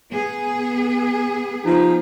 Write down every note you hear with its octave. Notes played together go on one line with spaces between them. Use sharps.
B3 G#4
F3 D#4